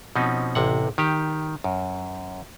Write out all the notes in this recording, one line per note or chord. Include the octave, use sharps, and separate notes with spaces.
B2 F3 C4 C#4 D#4
A1 C3 F#5
D#3 G4
F#2